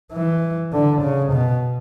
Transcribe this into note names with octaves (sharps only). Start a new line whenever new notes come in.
E3
D3
C#3
B2